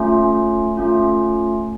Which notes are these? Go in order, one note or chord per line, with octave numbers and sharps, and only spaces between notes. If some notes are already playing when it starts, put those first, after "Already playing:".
Already playing: A3 C#4 F4
A3 C#4 F4